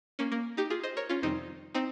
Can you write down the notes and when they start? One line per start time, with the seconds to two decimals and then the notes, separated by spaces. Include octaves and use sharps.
0.19 A#3 C#4
0.32 A#3
0.57 D#4 G4
0.70 F4 G#4
0.84 C5 D#5
0.97 A#4 C#5
1.09 C#4 F4
1.22 F2 C3 D#3 G3 C4 D#4
1.75 C4 D#4